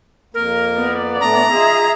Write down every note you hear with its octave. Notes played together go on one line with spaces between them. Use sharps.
F2 A#3 A#4
B3 D5
A2 A3 D4 A#5
D#4 F4 G#4 E5